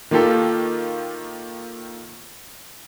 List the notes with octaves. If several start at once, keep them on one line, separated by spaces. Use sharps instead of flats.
D#3 A#3 F4 G4 A4